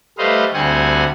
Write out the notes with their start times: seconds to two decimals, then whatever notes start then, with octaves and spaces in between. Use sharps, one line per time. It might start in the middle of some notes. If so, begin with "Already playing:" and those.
0.18 G3 A3 B4 C5 D#5 F5
0.54 D2 G3 C4 F#5 G#5